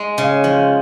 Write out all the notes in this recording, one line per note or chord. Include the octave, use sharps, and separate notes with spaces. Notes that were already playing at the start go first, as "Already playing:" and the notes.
Already playing: G#3
C#3
F3